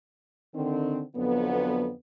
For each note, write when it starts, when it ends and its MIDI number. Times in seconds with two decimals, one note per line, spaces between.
0.55 1.01 50
0.55 1.01 51
0.55 1.01 60
1.16 1.91 41
1.16 1.91 50
1.16 1.91 54
1.16 1.91 59